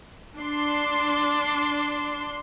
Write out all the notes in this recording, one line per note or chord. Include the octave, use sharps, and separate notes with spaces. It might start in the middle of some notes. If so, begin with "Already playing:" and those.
D4 C6